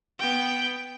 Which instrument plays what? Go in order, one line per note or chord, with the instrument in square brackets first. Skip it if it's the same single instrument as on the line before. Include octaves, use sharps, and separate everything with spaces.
[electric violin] B3 G5